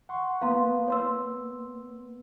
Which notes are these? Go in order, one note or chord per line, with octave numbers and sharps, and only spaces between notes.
F#5 C6 C#6
A#3 B3 B4 F5 A#5 C6
C#5 C6 E6